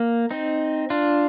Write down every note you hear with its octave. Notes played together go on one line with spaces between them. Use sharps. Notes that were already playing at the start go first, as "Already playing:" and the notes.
Already playing: A#3
C4 D#4
D4 F4